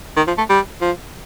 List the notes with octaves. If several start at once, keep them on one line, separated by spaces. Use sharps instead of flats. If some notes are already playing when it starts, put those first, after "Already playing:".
D#3
F3
A3
G3
F3